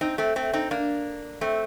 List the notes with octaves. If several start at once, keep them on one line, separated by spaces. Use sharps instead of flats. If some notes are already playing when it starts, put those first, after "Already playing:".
C4 D#4
A3 C4
A3 C4
C4 D#4
A#3 D4
A3 C4